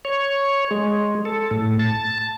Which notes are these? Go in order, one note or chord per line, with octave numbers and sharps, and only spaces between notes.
C#5
G#3
A4
A2
A5